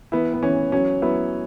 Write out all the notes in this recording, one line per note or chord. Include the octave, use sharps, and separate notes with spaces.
E3 B3 E4
B3
E3 C#4
F#3 C#4
F#3 B3 E4